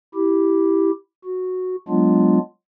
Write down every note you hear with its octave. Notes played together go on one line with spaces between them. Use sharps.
E4 G4
F#4
F#3 G#3 B3 D4 F4